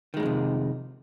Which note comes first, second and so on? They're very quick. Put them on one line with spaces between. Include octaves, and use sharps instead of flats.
D#3 G#3 A2 F2 C3